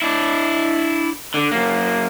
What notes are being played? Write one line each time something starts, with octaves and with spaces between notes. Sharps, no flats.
D4 E4
D3
F#2 A#3